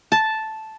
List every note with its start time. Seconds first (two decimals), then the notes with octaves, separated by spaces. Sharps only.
0.12 A5